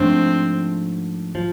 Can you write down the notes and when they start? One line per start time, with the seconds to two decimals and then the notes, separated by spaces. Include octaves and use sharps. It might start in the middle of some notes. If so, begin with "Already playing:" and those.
Already playing: G#2 F3 A3 C4 D4
1.35 F3